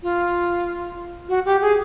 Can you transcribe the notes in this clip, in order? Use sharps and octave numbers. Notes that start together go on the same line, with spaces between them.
F4
F#4
G4
G#4